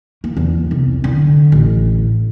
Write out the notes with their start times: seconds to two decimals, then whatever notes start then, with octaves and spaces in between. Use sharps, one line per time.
0.24 A#3
0.37 E2
0.71 C2
1.04 D3
1.52 A1